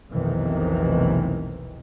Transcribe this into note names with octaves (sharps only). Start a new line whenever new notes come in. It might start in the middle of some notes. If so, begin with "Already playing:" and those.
F1 B1 C3 D#3 E3